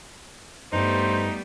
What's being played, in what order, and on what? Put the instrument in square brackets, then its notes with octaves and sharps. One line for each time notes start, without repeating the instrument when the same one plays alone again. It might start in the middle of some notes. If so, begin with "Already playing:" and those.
[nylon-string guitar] G2 A4 [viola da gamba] G3 A3 B3 [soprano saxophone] D#4 [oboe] C5